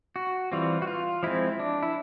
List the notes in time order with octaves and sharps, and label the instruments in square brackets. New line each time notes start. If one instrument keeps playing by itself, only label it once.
[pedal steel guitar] F#4
E3 G3 C4 F4
F#4
F4
F3 G#3 C4 E4
D4
E4